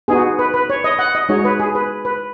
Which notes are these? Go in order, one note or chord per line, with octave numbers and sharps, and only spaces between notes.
B3 D#4 F#4 G#4
B4
B4
C#5
D#5
F#5
D#5
G#3 D#4 F#4 C#5
B4
G#4
B4
B4